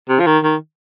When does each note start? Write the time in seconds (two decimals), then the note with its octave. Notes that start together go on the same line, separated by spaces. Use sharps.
0.09 C3
0.20 F3
0.26 D#3
0.44 D#3